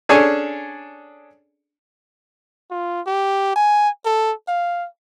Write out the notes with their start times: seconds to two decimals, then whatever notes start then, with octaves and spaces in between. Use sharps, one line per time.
0.09 C#4 D4 G#4 A4 C#5 G#5
2.71 F4
3.06 G4
3.56 G#5
4.05 A4
4.48 F5